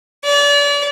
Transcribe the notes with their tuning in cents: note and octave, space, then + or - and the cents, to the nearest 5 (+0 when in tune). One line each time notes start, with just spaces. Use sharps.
D5 -35